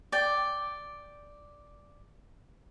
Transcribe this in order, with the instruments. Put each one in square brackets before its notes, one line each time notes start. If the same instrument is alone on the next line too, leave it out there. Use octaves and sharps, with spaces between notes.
[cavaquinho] D5 G5